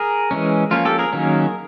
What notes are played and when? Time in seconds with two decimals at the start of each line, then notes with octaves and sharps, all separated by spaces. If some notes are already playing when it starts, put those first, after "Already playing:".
Already playing: G#4 A#4
0.31 E3 G#3 C#4
0.71 F3 A#3 C#4 F4
0.85 G4 A4
0.99 G#4 A#4
1.13 D#3 F#3 A#3 C#4